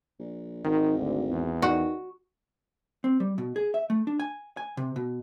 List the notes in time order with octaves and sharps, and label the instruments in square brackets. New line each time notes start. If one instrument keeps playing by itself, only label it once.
[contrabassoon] A#1
[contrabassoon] G#1 [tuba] D#3
[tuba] D2
E2
[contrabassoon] D#3 [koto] F#4
[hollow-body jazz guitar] C4
G3
B2
G#4
E5
A3
D4
G#5
G#5
C3
B2